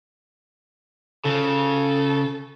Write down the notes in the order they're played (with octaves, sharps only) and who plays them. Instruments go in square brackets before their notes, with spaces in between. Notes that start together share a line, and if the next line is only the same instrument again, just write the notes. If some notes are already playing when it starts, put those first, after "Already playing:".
[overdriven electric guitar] C#3 [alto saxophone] A4